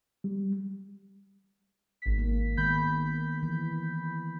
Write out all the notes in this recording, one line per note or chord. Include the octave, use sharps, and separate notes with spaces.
G3
G#1 B6
A#3
D#3 G#3 B3 B5 G6 B6
E3